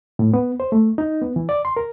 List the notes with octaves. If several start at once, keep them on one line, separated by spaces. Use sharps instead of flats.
A2
B3
C5
A3
D#4
B3
E3
D5
C6
A#4